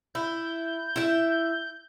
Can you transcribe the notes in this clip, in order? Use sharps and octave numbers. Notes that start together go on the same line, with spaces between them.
E4 G6
E4 E5